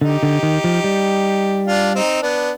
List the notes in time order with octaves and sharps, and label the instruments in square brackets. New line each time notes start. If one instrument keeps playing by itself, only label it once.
[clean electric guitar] D3 [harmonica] D#4 G4
[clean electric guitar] D3
D#3
F3
G3
[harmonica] D4 F4
C4 D#4
B3 D4